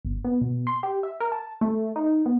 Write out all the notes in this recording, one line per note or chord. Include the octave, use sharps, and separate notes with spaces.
G1
B3
B2
C6
G4
E5
A#4
A5
A3
D#4
B3